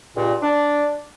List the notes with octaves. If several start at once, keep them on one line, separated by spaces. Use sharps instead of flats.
C#2 G2 A#2
D4